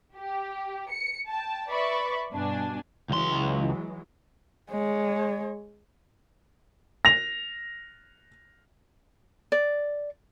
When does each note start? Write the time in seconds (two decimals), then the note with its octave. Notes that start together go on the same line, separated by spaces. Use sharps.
0.16 G4
0.90 C#7
1.27 G5 A5
1.68 B4 D5 E5 B5 C#6
2.32 G2 B2 D4 G#5
3.10 C#2 E3 F#3 G#3 C6
4.70 G#3 C#5
7.05 A#6 F7
9.52 D5